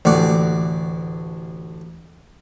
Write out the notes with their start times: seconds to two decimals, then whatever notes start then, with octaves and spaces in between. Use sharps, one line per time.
0.05 A1 D2 D5 F#5